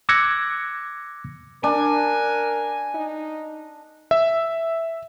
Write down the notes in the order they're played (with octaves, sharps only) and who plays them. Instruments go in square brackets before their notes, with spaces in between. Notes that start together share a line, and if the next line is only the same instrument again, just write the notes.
[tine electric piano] D6 E6 F#6 G#6 A#6 C#7
[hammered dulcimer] D4 [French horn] A#4 [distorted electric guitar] G#5
[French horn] D#4
[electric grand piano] E5